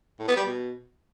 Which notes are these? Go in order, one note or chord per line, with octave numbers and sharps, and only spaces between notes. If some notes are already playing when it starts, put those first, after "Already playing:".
A2
B3
G3
B2